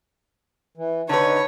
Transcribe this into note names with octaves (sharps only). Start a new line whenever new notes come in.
E3
D3 D#4 B4 C#5